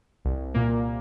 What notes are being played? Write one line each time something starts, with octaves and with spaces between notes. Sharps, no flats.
C2
A#2 A#3